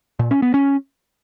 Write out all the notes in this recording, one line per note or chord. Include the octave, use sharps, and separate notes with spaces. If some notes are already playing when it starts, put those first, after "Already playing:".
A#2
C#4
B3
C#4